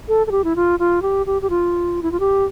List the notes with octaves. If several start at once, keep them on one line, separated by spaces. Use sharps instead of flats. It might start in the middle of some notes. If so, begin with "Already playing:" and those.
A4
A4
G4
E4
F4
F4
G4
G4
G4
F4
E4
F4
G4